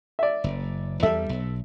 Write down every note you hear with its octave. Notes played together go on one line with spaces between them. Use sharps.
D5 E5
F#1
E2 G3 A4 E5
B1